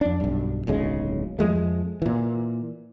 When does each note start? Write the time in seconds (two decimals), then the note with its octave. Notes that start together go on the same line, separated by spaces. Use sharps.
0.01 F2 D4
0.21 B1 G2
0.67 D1 B1 C#3 G#3
1.39 F2 F3 G#3 A3
2.02 A#2 E3